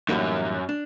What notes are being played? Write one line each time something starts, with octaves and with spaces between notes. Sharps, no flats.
F#2 A2 E3 G3 A#3 D#4
D4